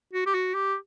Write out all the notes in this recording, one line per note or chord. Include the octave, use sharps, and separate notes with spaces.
F#4
G4
F#4
G4